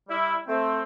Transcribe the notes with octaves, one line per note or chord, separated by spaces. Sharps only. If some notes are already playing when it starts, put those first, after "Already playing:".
G3 E4
A3 C4